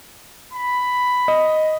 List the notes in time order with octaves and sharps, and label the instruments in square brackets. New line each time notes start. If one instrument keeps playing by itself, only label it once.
[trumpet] B5
[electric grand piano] D#5